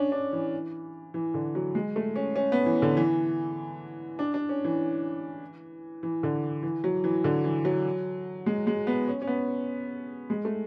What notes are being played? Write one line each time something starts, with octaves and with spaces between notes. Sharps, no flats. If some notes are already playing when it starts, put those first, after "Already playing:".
Already playing: C#4 D4
D4
E3
E3
D3
F#3
G#3
A3
C#4
C#4
B3
E3
D3
E3
D4
D4
C#4
E3
E3
D3
E3
F#3
E3
D3
E3
F#3
G#3
G#3
B3
C#4
C#4
B3
G#3
A3